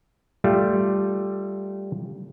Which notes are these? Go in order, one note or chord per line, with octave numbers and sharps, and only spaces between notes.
G3 A3 F4